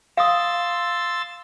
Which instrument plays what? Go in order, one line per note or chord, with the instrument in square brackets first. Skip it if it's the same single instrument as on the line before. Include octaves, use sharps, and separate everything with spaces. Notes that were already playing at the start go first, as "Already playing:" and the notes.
[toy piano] F5 D#6 [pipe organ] C6 E6 A6